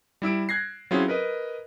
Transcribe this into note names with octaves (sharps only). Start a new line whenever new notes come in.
G3 E4 E6 D7
F#6 G#6 A#6 C7
F#3 C4 C#4 E4 F4 G#4
A#4 B4 D#5